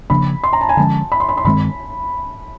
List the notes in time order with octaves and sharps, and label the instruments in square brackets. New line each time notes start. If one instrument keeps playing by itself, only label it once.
[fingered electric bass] C#3 F3 A#3 D4 [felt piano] B5
[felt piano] C6
A#5
A5
G#5
[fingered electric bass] D3 F3 G#3 C#4 [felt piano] A5
[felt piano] B5
C6
B5
C6
[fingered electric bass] G2 D#3 G#3 C4 [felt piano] B5